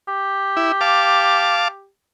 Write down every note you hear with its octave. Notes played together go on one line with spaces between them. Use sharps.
G4
E4
F5 A5 D6